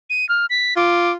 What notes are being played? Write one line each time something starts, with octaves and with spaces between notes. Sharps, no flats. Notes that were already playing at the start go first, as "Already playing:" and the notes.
D#7
F6
B6
F4 D6